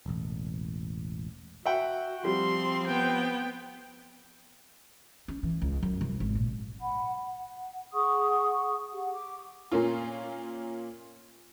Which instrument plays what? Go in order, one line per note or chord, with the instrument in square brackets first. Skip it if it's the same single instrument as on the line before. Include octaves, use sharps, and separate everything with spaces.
[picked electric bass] E1 A1
[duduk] F#4 [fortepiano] E5 F#5 G5
[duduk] F3 [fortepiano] G3 [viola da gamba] C4 [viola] C6
[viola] B3 G5
[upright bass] C#4
E3
C#2
F#2
C2
G#1
A#2
[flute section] F#5 B5
F#5
G#4 F#5 C#6 D#6
G4 F#5
D6
[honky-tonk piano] A#2 A#3 C#4 F4